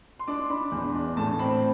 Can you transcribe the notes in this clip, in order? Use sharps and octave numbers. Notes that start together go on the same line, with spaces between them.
C6
D4 D6
D4 B5
E2
D4
A2 A5
C4 B5